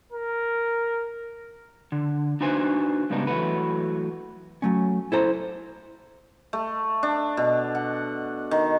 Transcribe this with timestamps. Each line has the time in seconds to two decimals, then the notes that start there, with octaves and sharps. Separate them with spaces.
0.12 A#4
1.92 D3
2.41 D4 D#4 F#4 B4 C5 G#5
3.10 G#2 C#3 G3 B3 D4 D#4
3.27 E3 F#3 A3 F#4 B4
4.62 F#3 A3 C#4
5.12 E4 A4 C5 A#5
6.53 A3
7.03 D4
7.37 B2
7.75 F#5
8.51 D#3